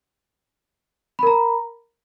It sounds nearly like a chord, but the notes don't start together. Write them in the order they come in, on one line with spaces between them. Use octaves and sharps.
B5 A#4 A#5